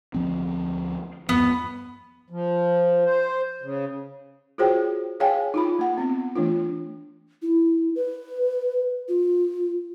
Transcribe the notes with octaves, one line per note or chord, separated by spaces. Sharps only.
D2 F3 C4
E2 G2 F3 B3
F3
C5
C#3
F4 F#4 G#4 C5 C#5 G5
G#4 C#5 F5 G5 G#5
D#4 F4 B5
A#3 F#5
B3 C4
E3 A3 D4 F4
E4
B4
F4